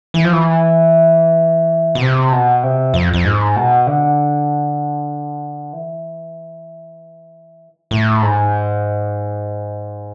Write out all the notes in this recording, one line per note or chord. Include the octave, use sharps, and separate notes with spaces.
E3
F3
E3
B2
C3
B2
C3
F2
F2
G#2
B2
D3
E3
A2
G#2